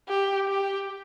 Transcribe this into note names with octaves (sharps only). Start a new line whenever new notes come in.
G4
G4